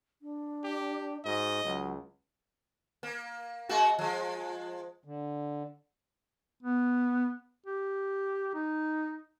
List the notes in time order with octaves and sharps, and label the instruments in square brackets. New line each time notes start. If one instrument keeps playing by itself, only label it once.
[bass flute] D4
[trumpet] G4
[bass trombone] G#2 [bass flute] F#4 [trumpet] D#5
[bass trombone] C#2 [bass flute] F#3
[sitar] A#3
G#3 A#3 F#4
F3 G#3
[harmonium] D3
[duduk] B3
G4
D#4